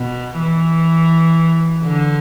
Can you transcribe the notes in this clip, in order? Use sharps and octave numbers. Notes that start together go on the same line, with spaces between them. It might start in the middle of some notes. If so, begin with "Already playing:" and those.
Already playing: B2
E3
D3